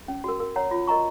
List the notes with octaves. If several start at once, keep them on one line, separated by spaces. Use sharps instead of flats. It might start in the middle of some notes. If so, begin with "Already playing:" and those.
C#4
F#4 A#4
A#4
C#5 F#5 A#5
F4
A#4 D#5 A#5 C#6